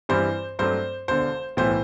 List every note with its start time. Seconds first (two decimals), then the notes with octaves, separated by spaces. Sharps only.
0.09 G2 E3 G3 C4 C5
0.59 G2 F#3 A3 C4 C5
1.08 E1 E2 D3 C5
1.57 B1 A2 E3 C5